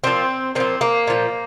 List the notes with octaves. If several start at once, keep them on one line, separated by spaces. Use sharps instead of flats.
A#2 F3 C4
A#2 F3 C4
A#3
A#2 F3